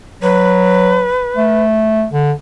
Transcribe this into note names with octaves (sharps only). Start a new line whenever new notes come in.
F#3 B4
A3
D3